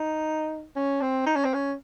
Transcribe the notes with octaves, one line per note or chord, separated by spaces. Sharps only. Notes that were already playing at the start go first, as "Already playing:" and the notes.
Already playing: D#4
C#4
C4
D#4
C#4
C4
C#4